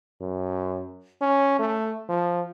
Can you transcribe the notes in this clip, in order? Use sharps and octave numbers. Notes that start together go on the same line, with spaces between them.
F#2
C#4
A3
F3